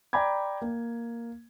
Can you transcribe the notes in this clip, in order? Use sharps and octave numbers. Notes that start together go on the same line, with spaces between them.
D5 G5 A#5 B5 D6 G#6
A#3